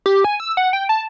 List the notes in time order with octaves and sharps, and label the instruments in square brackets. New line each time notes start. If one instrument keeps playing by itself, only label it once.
[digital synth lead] G4
G#5
E6
F#5
G5
A5